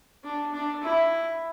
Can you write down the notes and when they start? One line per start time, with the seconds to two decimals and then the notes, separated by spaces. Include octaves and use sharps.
0.24 D4
0.53 D4
0.83 E4